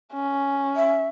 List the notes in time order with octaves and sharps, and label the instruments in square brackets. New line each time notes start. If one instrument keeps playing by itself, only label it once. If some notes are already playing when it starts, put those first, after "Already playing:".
[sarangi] C#4
[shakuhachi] E5